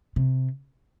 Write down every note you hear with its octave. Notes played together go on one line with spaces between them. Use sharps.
C3